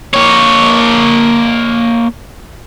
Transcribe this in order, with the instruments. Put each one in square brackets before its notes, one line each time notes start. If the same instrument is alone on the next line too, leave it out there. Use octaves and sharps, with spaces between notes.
[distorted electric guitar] A#3 C#5